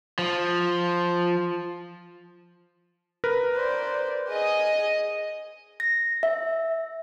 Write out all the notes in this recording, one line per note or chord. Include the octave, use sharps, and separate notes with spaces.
F3
A#4 B4
C5 D5
G#4 D#5
A#6
E5